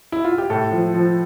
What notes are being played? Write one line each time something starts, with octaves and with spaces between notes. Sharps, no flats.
E4
F4
G4
A2 A4
F3
F3